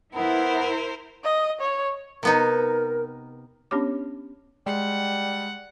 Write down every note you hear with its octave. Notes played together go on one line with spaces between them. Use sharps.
B3 E4 A#4 C5
D#5
C#5
C3 B3 D#4 A#4
B3 C#4 D4 G4 C#5 D6
G3 G#3 F#5